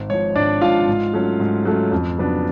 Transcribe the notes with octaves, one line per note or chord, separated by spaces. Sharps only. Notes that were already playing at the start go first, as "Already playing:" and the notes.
Already playing: G#1
G#2 F3 C#5
G#1 D4 D5
G#2 F3 F4 F5
G#2
F#3 A3 C#4
G#2
F#3 A3 C#4
F2
C#3 F#3 B3 D4